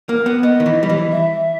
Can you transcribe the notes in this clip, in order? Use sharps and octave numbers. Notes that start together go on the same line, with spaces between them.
A#3
B3
B3 D#5
D#3
E3
G3
E3
E5